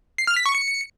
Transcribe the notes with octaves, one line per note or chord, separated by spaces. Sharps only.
C7
F6
B6
C#6
C#7